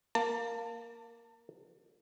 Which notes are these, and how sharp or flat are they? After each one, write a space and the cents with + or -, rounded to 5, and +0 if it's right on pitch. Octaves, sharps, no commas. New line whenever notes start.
A#3 +0 A5 +30